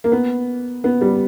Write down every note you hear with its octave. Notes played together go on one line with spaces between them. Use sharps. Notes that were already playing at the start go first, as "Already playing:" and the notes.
A#3
B3
B3
G3